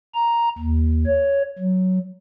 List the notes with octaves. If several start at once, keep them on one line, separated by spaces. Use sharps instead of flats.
A#5
D#2
C#5
F#3